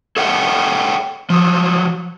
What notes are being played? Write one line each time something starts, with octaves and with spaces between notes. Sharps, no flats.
G#4 A4 C#5 E5 F#5 G5
F3 F#3